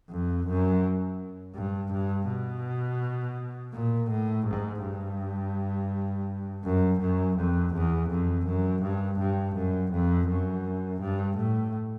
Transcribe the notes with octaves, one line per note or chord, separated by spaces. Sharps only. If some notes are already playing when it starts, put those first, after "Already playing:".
F2
F#2
G2
G2
B2
A#2
A2
G#2
G2
F#2
F#2
F2
E2
F2
F#2
G2
G2
F#2
F2
F#2
G2
A2